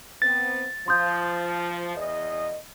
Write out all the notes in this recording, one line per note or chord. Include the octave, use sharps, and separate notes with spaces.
B3 C4 A6
F3 C6 D#6 G6
E2 D#5